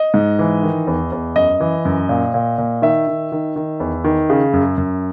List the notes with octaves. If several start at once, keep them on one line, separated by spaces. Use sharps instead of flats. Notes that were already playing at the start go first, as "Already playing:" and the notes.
Already playing: D#5
G#2
E3
D#3
E2
E2
F#2 D#5
E3
F#2
A#2
A#2
A#2
D#3 E5
D#3
D#3
D#3
E2
D#3
C#3
F#2
F#2